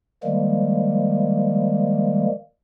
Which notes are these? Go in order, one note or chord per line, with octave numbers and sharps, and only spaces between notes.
D#3 F3 G3 G#3 A#3